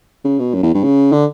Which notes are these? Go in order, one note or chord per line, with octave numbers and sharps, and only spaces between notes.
C#3
B2
F#2
E2
G2
C#3
D3